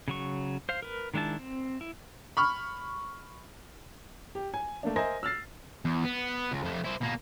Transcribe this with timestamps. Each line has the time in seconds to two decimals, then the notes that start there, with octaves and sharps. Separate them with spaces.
0.08 C#3 F#3 C#6
0.69 C5 F5
0.82 A#4 B4
1.14 D#3 G#3 D4 E4 A5
1.39 C4
1.81 E4
2.37 B5 C#6 F6
4.35 G4
4.54 G#5
4.83 A3 A#3 D4
4.96 A#4 C5 D#5 E5 G#5 A#6
5.23 E6 F6 A6 C7
5.85 E2
6.05 B3
6.52 C#2
6.64 F2 A3
6.85 E4 C5
7.01 B2 A#3